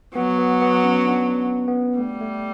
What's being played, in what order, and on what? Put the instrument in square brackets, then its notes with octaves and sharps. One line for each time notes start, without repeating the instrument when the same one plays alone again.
[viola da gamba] F#3 [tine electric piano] B3
[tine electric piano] B3
B3
C#4
D4
B3
[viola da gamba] G3 [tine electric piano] A3
[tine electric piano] A3